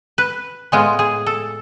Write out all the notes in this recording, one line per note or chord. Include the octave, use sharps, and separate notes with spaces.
B4
A2 G#3 B3 F4 G#4
G#4
A4